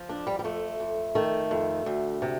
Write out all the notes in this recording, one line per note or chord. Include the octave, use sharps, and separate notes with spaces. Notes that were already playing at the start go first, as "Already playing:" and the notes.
Already playing: F3
F2 D4
G3
G3
F2 A3
F2
D#3 A3
F2
D2
C3